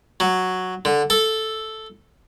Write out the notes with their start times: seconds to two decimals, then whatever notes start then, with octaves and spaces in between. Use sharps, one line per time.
0.20 F#3
0.85 D3
1.10 A4